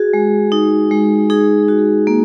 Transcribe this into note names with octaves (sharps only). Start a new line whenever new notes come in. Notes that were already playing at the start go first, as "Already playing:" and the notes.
Already playing: F#4 G#4
G#3
D#4
G#3
D#4 G#4
F#4
A#3